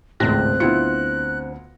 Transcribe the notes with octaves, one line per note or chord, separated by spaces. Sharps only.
G#1 C#2 A2 C4 F#6 A#6
D2 B3 E4 F4 C#7